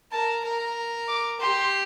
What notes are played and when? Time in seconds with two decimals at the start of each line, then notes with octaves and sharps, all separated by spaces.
0.12 A#4 A5
0.44 A#4 A#5
1.08 D6
1.40 G4 C6